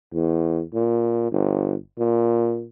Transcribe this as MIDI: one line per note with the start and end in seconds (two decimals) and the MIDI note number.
0.14 0.62 40
0.74 1.29 46
1.32 1.74 31
1.99 2.65 46